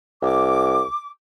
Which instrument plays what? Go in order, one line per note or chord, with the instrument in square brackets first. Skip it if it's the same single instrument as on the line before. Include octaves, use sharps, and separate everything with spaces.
[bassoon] C2 [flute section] D6